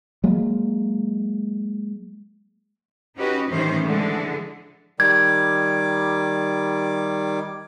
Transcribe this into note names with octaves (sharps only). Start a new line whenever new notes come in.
F#3 G#3 A#3
C#4 D#4 F#4 G4 B4 D#5
A2 D#3 E3 G3 C#4 C5
D3 E3 F3 G#3
D#3 G3 D6 G#6